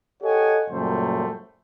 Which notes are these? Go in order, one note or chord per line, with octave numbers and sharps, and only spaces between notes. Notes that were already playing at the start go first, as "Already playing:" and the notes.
G4 A4 C#5 D#5 F#5 G#5
F#2 A#2 C#3 G3 A3 C5